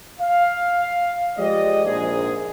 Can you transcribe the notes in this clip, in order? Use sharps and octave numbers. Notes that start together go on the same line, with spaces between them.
F5
F3 G#3 G4 D5 D#5
A#1 G#2 G#4